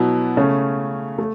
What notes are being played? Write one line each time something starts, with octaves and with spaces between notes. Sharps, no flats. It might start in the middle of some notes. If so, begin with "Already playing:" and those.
Already playing: B2 F#3 B3 E4
C#3 A3 C#4
A3